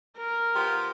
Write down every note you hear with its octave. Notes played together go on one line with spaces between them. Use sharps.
A#4
F3 B3 G4